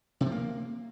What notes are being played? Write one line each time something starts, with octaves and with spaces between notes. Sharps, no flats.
C3
F3
A#3